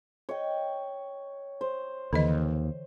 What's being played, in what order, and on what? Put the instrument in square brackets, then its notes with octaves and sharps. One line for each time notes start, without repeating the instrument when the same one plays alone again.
[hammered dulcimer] C#5 D#5 G5
C5
[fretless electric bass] D#2 [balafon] D3 E3 D#5